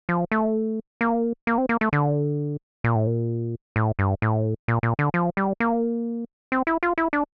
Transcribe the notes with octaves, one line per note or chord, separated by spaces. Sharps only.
F3
A3
A#3
A#3
C4
A#3
A3
D3
A#2
A2
A#2
A2
G2
A2
A#2
A#2
D3
F3
G3
A#3
C4
E4
F4
E4
D4